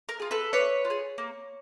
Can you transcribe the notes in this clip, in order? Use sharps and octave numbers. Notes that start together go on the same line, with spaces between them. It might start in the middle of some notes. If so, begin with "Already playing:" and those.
A#4
F4 G#4
A4 B4
D4 B4 C#5
F4
G#4
A#3